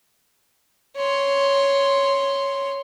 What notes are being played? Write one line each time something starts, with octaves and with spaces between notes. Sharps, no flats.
C#5 C6